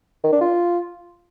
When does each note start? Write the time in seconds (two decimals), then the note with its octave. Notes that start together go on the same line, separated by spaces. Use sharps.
0.24 D#3
0.32 D4
0.41 F4